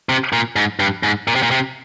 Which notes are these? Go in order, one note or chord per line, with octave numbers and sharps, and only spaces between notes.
C3
A#2
G#2
G2
G#2
A#2
C3
A#2
C3